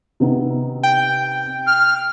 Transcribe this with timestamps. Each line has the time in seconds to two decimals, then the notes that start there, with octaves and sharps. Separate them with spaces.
0.20 C3 B3 D#4
0.83 G5
1.66 F6